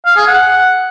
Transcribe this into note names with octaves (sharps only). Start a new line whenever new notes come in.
F5
G#4
F#5